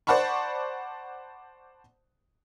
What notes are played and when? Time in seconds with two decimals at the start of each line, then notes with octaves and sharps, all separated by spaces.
0.07 C5 D5 F#5 A5 B5 C#6